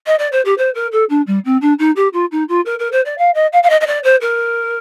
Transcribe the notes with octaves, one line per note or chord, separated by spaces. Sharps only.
D#5
D5
C5
G4
C5
A#4
A4
D4
G3
C4
D4
D#4
G4
F4
D#4
F4
A#4
A#4
C5
D5
F5
D#5
F5
F5
D#5
D#5
D5
C5
A#4